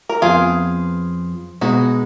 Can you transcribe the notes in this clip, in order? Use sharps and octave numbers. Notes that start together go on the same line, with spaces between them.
A#4
F2 F3 B3 F4 G#4
B2 G#3 B3 D#4 F#4